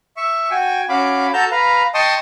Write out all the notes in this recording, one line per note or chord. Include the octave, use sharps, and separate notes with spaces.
E5 C#6
F#4 G5 G#5
C#4 F#4 F5 B5 D6
F#4 A4 A5 A#5 G6
B4 F5 A#5
D#5 G5 A5 C6 C#6 D#6